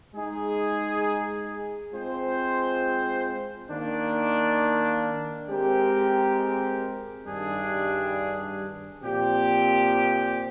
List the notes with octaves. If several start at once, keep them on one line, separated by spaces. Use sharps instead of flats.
G#3 D#4 G#4
G#3 C4 F4 C5
D#3 A#3 D4
G#3 C4 G4 A#4
G2 D#3 G3 D4 G#4
A#2 F3 C4 G4